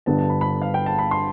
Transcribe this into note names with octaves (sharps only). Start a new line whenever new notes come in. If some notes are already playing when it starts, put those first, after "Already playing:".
G1 G2 D3 G3 B3 A5
A5
B5
B5
F5
G5
A5
B5
C6